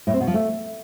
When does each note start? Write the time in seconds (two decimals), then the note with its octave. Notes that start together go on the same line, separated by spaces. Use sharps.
0.07 A2
0.14 C4
0.21 B2
0.27 F3
0.34 A3